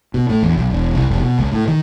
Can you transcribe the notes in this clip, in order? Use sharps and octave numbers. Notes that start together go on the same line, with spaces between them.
B2
A2
E2
B1
E1
C2
F1
B2
C#2
A2
D#3